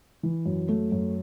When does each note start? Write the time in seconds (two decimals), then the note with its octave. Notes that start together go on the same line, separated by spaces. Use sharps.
0.23 E3
0.46 F#2
0.69 A3
0.92 F#2